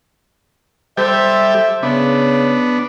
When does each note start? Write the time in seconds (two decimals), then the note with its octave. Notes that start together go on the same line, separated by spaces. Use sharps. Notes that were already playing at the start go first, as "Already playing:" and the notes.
0.97 G3 G4 A4 C5 E5
1.83 C#3 B3 D4